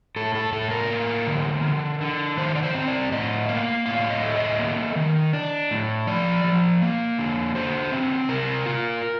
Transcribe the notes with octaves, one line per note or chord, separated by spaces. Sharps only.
A2 A4
A4
A2 A4
A#4
A#3
D3
D3
D3
D#3 C5
D5
C5
C4
D5
A2 D#5
A#3 F5
A2 F5
D#5
A3
D#5
A#3
D#3
D4
A2
F3 D5
F3
A#3
D3
D3 C5
C4
C3 A#4
F4